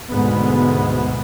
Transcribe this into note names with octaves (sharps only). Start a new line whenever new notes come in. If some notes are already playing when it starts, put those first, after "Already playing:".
D2 G#2 B2 B3